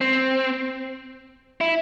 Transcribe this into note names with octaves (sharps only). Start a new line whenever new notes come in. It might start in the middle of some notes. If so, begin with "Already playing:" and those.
C4
E4